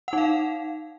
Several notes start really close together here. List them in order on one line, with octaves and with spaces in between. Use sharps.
F#5 D#4 F5